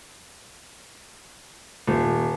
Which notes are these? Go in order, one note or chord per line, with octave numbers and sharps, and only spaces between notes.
D#1